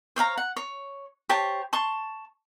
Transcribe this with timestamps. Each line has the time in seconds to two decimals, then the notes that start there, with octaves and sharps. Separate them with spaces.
0.16 C5 C#5 F5 A#5
0.37 F#5
0.56 C#5
1.29 G4 C5 C#5 A5
1.73 A5 C6 C#6